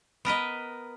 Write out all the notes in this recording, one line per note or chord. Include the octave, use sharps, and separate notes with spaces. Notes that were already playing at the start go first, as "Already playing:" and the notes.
B3 A#4 B4 D#5